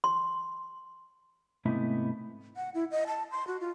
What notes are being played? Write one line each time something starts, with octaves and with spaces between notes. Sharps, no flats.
C6
G#2 C3 A3 B3 D#4 E4
F#5
E4
D#5
A5
C6
F#4
F4